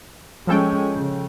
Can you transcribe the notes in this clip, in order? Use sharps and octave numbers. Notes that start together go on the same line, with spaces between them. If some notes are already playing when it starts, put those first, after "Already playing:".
F3 G#3 C#4 A4 G5
C#3